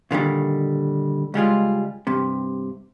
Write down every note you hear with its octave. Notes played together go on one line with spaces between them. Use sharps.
A#2 D3 D#3 G3
C#2 G3 G#3 F4
G2 C3